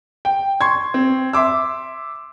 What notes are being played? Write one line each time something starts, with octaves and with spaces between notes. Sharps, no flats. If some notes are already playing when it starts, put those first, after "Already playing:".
G5
C6 C#6 G#6
C4
E5 C6 D6 E6